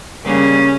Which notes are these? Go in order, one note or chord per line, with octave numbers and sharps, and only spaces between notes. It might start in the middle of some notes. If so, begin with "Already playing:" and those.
C#3 G3 A#3 C#4